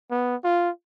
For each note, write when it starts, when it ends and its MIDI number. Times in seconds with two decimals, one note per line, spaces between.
0.11 0.36 59
0.44 0.70 65